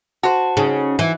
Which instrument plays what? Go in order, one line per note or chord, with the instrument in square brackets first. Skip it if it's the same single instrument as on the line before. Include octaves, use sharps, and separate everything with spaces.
[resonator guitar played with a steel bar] F#4 C5 [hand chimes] A5
[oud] C#3 [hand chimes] D#4
[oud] E3